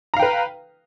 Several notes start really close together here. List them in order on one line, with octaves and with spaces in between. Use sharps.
A#5 F5 G5 B4